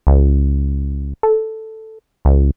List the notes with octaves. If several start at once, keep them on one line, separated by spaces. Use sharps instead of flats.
C#2
A4
C#2